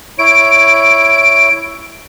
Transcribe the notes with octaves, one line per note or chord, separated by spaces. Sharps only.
E4 C#5 D7